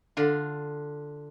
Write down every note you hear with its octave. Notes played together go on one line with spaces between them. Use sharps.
D3 D4 F4